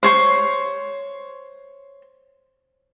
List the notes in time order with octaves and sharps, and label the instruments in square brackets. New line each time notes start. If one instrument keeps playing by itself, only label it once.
[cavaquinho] C5 C#5 C6